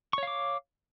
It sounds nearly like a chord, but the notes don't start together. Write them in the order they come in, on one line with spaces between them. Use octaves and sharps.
C#6 C#5 F5 D6